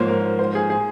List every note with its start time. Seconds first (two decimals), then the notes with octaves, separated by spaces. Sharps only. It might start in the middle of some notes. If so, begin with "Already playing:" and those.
Already playing: G#2 F3 A#3 C5 C#5
0.08 A#4
0.39 C5
0.55 G#4
0.70 G#4